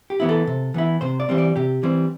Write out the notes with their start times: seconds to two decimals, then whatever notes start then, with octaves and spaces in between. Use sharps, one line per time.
0.10 G4
0.20 E3 B3 E4
0.29 A4
0.47 C3
0.74 E3 B3 E4
1.01 C3 C5
1.20 D5
1.29 E3 G3 C4
1.38 D5
1.56 C3 G4
1.83 E3 G3 C4